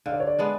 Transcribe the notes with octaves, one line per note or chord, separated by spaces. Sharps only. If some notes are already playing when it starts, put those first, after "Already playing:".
D3 F5
D5
C#5
D5
G#3 B3 D4